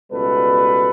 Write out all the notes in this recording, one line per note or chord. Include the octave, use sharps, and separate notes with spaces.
C#2 B2 G3 B3 A4 B4